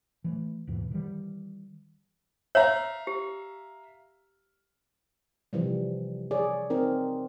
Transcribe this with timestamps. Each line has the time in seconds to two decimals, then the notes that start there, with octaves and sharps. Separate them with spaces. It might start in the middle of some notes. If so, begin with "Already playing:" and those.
0.24 E3 G#3 A3
0.67 D#2 G#2 B2 E3
0.91 D#3 E3 F#3 G3
2.55 C#5 E5 F5 A#5
3.07 G4
5.53 C3 E3 F3 G3
6.31 G#4 C#5 D5
6.70 C4 D#4 A#4